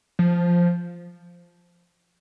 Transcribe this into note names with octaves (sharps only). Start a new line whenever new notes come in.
F3